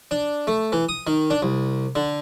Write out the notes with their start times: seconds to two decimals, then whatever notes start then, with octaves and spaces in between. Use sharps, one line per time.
0.11 D4
0.47 A3
0.72 E3
0.89 D#6
1.07 D#3
1.30 D4
1.42 C2
1.95 D3